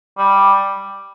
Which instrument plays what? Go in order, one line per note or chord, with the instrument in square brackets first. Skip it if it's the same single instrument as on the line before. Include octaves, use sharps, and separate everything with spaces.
[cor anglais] G3